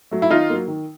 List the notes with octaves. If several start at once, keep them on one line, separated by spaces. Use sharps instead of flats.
F#3 A3
E4
D#3 D#4 F4
F#3 A#3
D#3